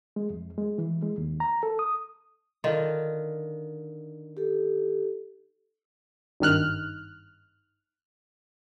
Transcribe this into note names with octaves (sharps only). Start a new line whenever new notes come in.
G#3
F2
G#3
E3
G#3
D#2
A#5
A4
D#6
D3 D#3 F4
G4 A4
G#1 G2 D#3 F6 F#6